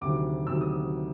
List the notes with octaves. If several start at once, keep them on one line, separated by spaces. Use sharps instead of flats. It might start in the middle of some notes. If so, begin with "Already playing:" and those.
D2 C3 D#3 F#3 D6
D2 C3 D#3 F#3 E6
D#6